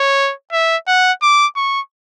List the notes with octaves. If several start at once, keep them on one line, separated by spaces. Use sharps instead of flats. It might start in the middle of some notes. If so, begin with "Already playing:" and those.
Already playing: C#5
E5
F#5
D6
C#6